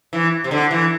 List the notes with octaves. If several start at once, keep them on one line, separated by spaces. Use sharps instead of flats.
E3
C3
D3
E3